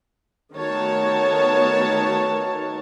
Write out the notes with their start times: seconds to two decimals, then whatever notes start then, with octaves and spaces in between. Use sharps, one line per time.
0.55 D#3 A3 B3 F#4 C#5 A5